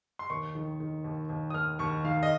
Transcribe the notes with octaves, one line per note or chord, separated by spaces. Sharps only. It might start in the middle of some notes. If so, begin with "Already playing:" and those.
C6
D#2 C#6
D#3
D#3
D#2
D#2
D#6
D#2 F6
D#2 C#6
D#3 F5
D#5